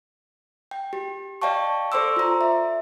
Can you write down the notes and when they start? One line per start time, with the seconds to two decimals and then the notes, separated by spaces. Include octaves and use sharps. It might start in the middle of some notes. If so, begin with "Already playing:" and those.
0.71 G5
0.93 G4
1.42 D5 D#5 F5 G5 A5 C#6
1.92 A4 C5 D5 C6 D6 E6
2.16 F4 A#5
2.41 E5